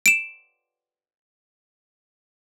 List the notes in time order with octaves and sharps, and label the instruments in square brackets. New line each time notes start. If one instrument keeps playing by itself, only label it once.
[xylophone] D7 E7